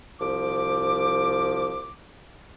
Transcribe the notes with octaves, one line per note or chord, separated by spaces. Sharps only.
C2 F3 D6